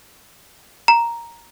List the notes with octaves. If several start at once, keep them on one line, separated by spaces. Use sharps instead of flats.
A#5